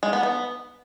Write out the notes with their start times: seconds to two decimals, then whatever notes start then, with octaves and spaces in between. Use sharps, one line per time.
0.03 G#3
0.13 B3
0.23 B3